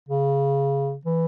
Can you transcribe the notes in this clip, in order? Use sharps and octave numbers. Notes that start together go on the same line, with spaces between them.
C#3
E3